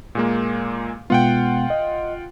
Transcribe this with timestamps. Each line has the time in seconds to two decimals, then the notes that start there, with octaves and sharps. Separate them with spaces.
0.15 A#2 G#3 A#3
1.10 B2 G#3 B3 F4 F#5 G5
1.70 D#5